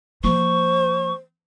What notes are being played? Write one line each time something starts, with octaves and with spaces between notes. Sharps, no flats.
F3 A#3 C5 C#6